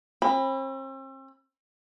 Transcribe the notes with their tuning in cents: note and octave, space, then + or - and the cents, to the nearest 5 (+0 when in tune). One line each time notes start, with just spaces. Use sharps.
C4 +40 B5 +0